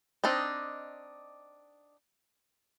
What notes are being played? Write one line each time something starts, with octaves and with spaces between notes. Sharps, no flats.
C4 D4 D#4 D#5